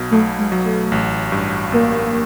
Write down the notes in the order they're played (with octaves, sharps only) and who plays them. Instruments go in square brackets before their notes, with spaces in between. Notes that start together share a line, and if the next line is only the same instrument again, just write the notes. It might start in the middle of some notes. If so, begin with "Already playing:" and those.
Already playing: [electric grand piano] B1 B2
[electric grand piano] B1 [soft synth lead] A3
[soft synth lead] G#3
[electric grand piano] F#3
[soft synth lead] A3
[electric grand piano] A1
G2
[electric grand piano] A1 [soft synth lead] A#3